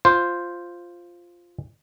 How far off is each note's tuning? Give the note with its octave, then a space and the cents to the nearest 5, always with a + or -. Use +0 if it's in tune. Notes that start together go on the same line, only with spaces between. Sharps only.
F4 +0 C5 +0